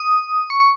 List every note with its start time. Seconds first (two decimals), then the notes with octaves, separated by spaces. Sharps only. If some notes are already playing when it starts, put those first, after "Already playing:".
Already playing: D#6
0.50 C#6
0.60 C#6